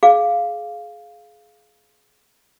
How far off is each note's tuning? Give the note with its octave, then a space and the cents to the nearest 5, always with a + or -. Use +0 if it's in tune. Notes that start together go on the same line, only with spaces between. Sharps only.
G#4 +25 D5 +0 F5 +0